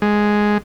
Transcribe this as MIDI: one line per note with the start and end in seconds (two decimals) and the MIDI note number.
0.02 0.58 56